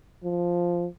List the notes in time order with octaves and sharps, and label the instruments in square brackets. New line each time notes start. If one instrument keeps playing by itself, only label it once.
[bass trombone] F3